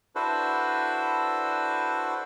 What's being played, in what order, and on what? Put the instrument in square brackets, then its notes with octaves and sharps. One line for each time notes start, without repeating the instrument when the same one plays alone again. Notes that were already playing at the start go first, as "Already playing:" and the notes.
[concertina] D4 E4 F#4 A4 B4 C5